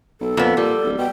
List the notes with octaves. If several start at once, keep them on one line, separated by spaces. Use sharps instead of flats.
B1 A4
F2 A#2 B3
A#2 G3
D1
B2 G5